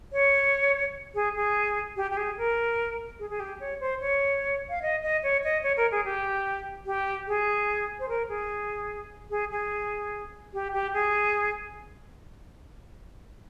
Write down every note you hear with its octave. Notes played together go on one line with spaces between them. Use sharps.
C#5
G#4
G#4
G4
G4
G#4
A#4
G#4
G#4
G4
C#5
C5
C#5
F5
D#5
D#5
C#5
D#5
C#5
A#4
G#4
G4
G4
G#4
C5
A#4
G#4
G#4
G#4
G4
G4
G#4